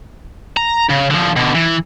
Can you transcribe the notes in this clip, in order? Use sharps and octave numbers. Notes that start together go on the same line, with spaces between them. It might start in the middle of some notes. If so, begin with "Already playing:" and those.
A#5
C#3
D3 F3
B2 D3
E3